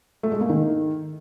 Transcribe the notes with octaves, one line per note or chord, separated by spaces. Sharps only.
A3
G#3
A#3
D#3